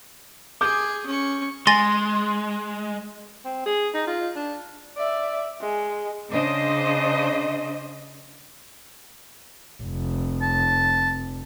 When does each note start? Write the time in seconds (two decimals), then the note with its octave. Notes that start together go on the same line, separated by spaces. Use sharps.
0.61 G#4 D6 G6
1.06 C#4 C#6
1.67 G#3 G#5 C6 A6 A#6
3.45 C4
3.66 G#4
3.94 D#4
4.07 F4
4.36 D4
4.98 D5 E5
5.61 G#3
6.29 C#3 D4 C5 D#5
9.82 F1
10.42 A5